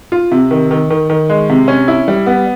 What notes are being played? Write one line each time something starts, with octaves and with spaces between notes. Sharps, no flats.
F4
C3
D#3
D#3
D#3
D#3
G#3
C3
C#4
E4
G3
B3